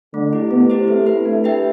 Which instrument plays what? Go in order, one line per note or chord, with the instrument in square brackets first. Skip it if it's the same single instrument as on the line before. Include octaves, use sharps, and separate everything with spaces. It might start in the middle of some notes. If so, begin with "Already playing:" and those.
[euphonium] D3 [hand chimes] A3
[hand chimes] E4 G4
[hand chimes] A3 [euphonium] B3
[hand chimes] E4 G4 C5
[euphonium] A3 [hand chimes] C4
[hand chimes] E4 B4
[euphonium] A3 [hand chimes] D4
[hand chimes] G4 B4 E5 G5